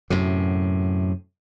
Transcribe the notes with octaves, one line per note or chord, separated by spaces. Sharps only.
F#2 A2 C3